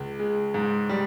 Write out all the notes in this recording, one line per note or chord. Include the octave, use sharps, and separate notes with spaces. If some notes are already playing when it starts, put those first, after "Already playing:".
Already playing: C#2
G#3
G#2
G3